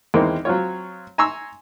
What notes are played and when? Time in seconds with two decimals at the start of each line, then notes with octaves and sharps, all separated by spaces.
0.14 E2 D#3 G#3 A#3 C4
0.45 F#3 C4 F4 C#5
1.18 G#5 A#5 C6 C#6 E6